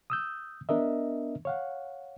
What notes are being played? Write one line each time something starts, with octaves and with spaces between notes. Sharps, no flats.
D#6 E6 G6
B3 D4 A#4 D#5 E5
C#5 F5 F#5